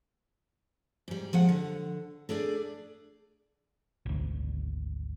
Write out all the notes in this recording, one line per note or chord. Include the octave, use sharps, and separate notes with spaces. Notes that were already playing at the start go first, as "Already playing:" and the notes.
G#2 G3
F3 G#3 F#5
D3
A3 D4 G#4 D5
G#1 D2